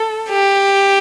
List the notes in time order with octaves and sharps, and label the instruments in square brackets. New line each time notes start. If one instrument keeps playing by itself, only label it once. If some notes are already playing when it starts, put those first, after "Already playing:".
Already playing: [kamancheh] A4
[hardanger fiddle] G4